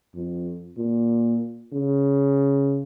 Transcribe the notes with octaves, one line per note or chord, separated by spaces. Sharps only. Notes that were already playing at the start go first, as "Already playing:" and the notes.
F2
A#2
C#3